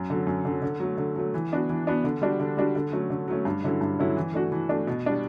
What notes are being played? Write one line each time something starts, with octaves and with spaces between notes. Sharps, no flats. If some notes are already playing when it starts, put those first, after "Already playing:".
Already playing: F#2
D3 F#3
F#2
D3 F#3
D3
F#3 A3
D3
F#3 A3
E3
B3 D4 F#4
E3
B3 D4 F#4
D3
G3 D4 F#4
D3
G3 D4 F#4
D3
F#3 A3 C#4
D3
F#3 A3 C#4
G2
D3 F#3 C#4 E4
G2
D3 F#3 C#4 E4
E3
A3 D4 F#4
E3
A3 D4 F#4
B2
G3 D4 F#4